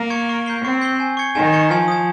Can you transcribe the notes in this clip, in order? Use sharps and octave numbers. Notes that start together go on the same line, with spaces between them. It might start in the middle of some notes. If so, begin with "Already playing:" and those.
Already playing: A#3
C#6 G#6 C#7
C#6
G6 C7 G7
C4 C#6
G6 C7 G7
G#5
C#6 G#6 C#7 G7
D#3 G#5
C#6 G#6 C#7 G7
F3 G#5
D#6 G#6